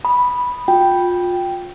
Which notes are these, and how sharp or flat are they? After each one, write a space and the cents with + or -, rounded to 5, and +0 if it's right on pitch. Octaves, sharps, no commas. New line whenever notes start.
B5 -5 D#6 -10
F4 +30 G5 +0